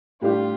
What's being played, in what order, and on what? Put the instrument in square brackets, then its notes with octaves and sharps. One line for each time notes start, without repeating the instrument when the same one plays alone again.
[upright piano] A2 G3 D4 G4 [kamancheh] F4